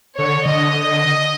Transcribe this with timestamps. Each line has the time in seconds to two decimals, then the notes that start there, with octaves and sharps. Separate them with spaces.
0.17 D3 C#5
0.46 D3 D#5